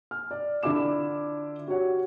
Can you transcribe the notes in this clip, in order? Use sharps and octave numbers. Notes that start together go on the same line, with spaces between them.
F6
D5
D3 D4 E4 F4 D6 E7
F#4 G4 C#5 F#5